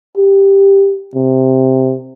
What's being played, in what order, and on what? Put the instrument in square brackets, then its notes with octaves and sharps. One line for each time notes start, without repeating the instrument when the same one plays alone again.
[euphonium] G4
C3